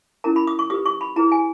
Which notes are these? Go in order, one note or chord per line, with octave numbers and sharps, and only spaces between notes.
C#4 E4 A#4 A#5
B5
D#6
C#6
G4 B4 D#6
C#6
B5
E4 G#4 B4 A#5
G#5